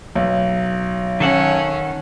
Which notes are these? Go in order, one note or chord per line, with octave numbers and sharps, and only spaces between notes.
B1
D#3 C#4 A4 F#5